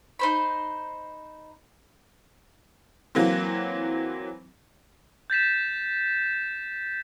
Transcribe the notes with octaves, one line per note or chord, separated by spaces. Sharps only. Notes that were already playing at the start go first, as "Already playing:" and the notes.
D#4 C5 B5
E3 F#3 A#3 C4
G6 A6 B6 E7